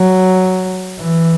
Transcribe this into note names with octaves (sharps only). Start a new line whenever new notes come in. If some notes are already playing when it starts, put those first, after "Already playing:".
Already playing: F#3
E3